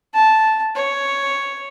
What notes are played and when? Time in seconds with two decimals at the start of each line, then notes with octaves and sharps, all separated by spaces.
0.14 A5
0.75 C#5